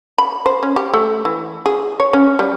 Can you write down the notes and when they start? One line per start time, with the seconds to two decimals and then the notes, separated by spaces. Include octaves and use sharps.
0.18 B5
0.46 C5
0.63 C#4
0.76 G4
0.93 A3
1.25 E3
1.66 G#4
2.00 C#5
2.13 C#4
2.39 G3